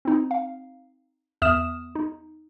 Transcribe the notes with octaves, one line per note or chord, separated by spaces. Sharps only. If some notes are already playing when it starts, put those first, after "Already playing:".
C4 D#4
F5
E2 B3 E5 D#6 F6 E7
D#4